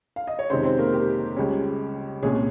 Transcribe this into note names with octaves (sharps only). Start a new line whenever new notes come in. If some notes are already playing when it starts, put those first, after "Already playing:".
F5
D#5
C#5
F2 C3 D#3 G#3 C4 C#4 C5
C4 C5
A#3 A#4
G4
C#2 C#3 G3 C#4
C2 A#2 G#3 C#4 G#4